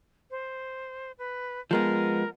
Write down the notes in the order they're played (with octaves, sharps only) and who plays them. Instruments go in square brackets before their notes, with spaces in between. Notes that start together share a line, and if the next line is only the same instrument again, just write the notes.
[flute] C5
B4
[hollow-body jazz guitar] F3 G#3 B3 [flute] A#4